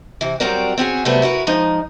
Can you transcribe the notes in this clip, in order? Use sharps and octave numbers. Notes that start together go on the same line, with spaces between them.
C3 E3
F#3 G3 C4 F#4 A#4 D5
C4 C#4 F#4 G#4
C3 F#3 G3 A3 B3
E4 F#4 A#4 B4
F3 G#3 D#4